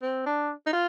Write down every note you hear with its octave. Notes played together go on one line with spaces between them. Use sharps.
C4
D4
D#4
F4